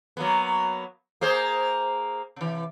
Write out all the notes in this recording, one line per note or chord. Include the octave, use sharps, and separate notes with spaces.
F#3 A#3 B3
A#3 G#4 C5
C3 E3